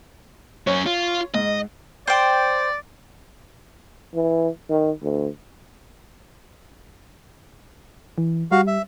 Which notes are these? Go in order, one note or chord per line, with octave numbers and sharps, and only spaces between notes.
F#2 C#4 C#5
F4
G#2 D#5
C5 D5 G5
E3
D#3
D2
E3
G3 F#4 F5
E5